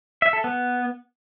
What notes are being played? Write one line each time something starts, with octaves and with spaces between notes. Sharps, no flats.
E5
A4
B3